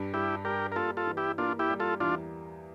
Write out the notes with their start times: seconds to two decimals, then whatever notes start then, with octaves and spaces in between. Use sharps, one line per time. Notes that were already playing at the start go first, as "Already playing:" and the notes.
Already playing: G2 G3
0.13 G3 E4 G4
0.44 G3 G4 A#4
0.72 A#4
0.76 A#3 F4 A4
0.97 F4 A4
1.07 E3
1.17 E4 G4
1.38 A#3 D4 F4
1.59 E4 G4
1.70 G3
1.80 F4 A4
2.00 E2 D4 F4